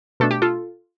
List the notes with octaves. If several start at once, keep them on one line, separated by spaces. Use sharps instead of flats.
B2 A3 D4 A4
G4
F4 A4